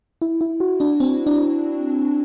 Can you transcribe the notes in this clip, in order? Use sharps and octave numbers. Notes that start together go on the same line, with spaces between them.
E4
E4
F#4
D4
C4
D4